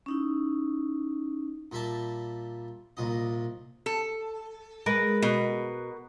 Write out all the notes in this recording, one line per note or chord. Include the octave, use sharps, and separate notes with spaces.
C#4 D#4 E4
A#2 G3 E5 A5
C2 A#2 D#5
A4
G#3 A#4 B4
B2